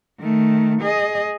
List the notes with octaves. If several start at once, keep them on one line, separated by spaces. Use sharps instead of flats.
D#3 A3
G#4 D#5